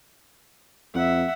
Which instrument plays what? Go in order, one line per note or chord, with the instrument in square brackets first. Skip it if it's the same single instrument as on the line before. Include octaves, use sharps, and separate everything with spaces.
[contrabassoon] F2 [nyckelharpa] E5 F#5